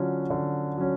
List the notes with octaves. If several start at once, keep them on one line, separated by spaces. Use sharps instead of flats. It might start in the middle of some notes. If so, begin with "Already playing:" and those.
Already playing: D3 F#3 C#4 F4
D3
F#3 C#4